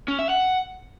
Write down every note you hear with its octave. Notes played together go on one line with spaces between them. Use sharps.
C#4
E5
F#5